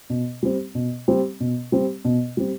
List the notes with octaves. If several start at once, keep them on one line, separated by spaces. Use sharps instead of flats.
B2
G3 C4
B2
G3 C4
B2
G3 C4
B2
G3 C4